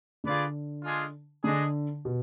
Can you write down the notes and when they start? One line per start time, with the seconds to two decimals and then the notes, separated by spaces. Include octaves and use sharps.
0.24 D3 F4 G#4 B4 D5
0.84 G#3 D4 F4 G#4
1.44 D3 G#3 D4 G#4 D#5
2.05 B2